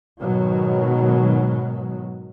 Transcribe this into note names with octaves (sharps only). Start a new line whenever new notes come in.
G#2 B2 D#3 F#3